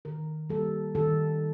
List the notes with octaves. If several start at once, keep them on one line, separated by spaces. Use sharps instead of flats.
D#3 A#4
G3 A#3 A4
D#3 A4